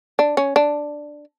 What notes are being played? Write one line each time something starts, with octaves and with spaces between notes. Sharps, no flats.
D4
C#4
D4